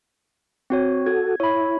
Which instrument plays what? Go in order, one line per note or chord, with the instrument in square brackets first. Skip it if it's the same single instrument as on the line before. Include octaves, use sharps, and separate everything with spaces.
[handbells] C4 F#4 C#5
[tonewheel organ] F#4 A4 [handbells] G#6
[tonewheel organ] E4 [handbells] C#5 B5